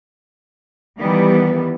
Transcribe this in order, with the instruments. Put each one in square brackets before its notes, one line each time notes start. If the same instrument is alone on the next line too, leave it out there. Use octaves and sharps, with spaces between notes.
[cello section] D#3 E3 G3 B3